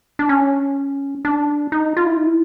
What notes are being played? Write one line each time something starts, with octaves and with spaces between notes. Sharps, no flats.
D4
C#4
D4
D#4
F4
E4
D#4
E4